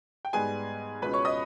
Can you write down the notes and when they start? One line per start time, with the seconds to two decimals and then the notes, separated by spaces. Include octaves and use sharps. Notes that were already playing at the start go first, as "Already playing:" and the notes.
0.25 G5
0.33 G#2 G3 B3 G#4 G#5
1.02 C#2 B2 G#3 C#4 B4 B5
1.13 C#5 C#6
1.25 D#5 D#6